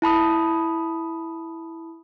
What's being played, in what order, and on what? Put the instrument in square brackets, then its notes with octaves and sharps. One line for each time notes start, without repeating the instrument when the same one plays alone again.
[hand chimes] E4 A5 B5 D#6